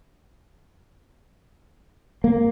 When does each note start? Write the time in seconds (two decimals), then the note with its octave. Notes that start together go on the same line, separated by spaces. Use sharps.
2.24 A#3